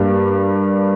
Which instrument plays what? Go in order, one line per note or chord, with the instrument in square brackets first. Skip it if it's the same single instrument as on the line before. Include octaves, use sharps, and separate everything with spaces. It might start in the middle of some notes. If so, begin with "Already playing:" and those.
Already playing: [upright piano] G2 G3 A#3 D4